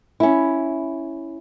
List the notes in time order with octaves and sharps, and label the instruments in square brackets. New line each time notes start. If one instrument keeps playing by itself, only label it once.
[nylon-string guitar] C#4 E4